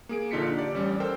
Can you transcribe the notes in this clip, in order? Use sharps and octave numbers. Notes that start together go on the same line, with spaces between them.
A#3 G#4 D7
A#1 D3 D#4 F4 B6 C#7
G4 D5
A1 G3 C#4
A4 A#4 C5 G5